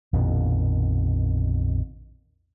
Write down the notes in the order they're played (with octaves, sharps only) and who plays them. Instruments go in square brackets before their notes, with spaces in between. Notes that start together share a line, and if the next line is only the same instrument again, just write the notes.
[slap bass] A#1 F2 B2 D#3